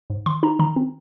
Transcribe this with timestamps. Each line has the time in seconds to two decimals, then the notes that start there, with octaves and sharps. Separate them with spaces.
0.10 G#2
0.26 D#3 C6
0.43 D#4 A#5
0.59 D#3 A#5
0.76 C4